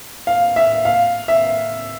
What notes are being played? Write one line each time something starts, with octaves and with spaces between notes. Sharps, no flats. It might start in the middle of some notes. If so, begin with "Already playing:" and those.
F5
E5
F5
E5